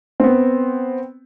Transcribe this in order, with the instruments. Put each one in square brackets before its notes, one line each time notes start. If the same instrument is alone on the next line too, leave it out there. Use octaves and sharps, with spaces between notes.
[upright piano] B3 C4